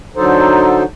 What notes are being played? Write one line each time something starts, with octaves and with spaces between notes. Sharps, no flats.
D3 F#3 D#4 A4 C5